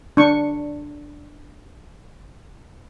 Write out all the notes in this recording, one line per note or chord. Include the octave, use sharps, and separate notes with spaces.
D4 C#6